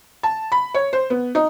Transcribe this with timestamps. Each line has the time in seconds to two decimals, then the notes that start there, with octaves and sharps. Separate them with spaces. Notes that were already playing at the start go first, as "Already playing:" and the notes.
0.23 A5
0.52 B5
0.74 C#5
0.93 C5
1.10 B3
1.35 D#4